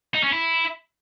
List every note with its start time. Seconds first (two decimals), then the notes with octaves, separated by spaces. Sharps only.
0.15 D#4
0.23 C#4
0.32 E4